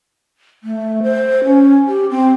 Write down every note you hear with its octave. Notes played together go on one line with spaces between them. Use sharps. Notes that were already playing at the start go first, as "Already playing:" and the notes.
A3
C5
C#4
G4
C4